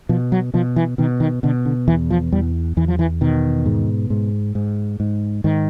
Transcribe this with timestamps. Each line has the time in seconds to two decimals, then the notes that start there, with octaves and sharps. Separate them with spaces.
0.09 B2 F3
0.32 F#3
0.54 B2 F3
0.76 E3
0.98 B2 D#3
1.20 D#3
1.43 B2 D3
1.65 D3
1.88 E2 E3
2.10 F3
2.32 E2 G3
2.77 E2 E3
2.88 F3
2.99 E3
3.21 B2 D#3
3.66 G#2
4.10 G#2
4.55 G#2
5.00 G#2
5.44 G#2 D#3